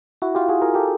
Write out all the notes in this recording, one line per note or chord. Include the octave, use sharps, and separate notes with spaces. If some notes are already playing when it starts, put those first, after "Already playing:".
E4 F#4
F4 G4
F#4 G#4
G#4 A#4
G4 A4